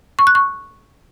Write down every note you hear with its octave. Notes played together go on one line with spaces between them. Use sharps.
C#6
F#6
C#6